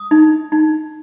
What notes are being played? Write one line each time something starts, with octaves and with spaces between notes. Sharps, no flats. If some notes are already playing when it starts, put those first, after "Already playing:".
Already playing: D#6
D#4
D#4